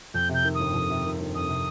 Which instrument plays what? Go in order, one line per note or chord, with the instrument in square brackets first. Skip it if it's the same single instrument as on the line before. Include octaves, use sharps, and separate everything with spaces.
[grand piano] F2 [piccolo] G6
[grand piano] C3
[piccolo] G6
[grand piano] D#3
[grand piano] G1 [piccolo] D#6
[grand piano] F2
C3
D#3
G1
[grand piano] F2 [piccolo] D#6
[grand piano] C3